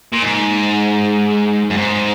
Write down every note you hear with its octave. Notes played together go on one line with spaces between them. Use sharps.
A#2
G#2
F#2
G#2